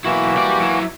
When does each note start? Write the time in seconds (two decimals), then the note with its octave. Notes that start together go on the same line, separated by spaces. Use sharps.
0.04 B1 E3 A#3 E4 F#4
0.36 G3 D5
0.60 F#3 E4